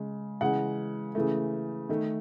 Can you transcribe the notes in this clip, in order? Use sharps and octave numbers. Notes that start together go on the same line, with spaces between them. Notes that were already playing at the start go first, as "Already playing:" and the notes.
Already playing: C#3 G#3
C#3 E3 G#3 F#5
C#3 E3 A3
D#3 A3